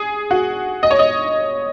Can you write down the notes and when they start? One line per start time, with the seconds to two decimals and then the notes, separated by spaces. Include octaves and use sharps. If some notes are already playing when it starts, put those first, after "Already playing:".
Already playing: G#4
0.31 F#4
0.83 D#5
0.91 C#5
0.99 D#5